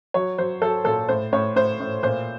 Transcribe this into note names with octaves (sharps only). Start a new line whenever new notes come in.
F#3 C#5
F#3 C5
F#3 A4
A#2 A4
A2 C5
A2 C#5
A2 C5
A2
A#2 C5